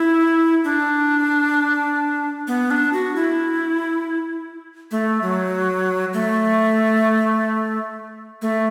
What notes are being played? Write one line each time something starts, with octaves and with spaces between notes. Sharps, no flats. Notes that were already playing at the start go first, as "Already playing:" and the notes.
Already playing: E4
D4
B3
D4
F#4
E4
A3
F#3
A3
A3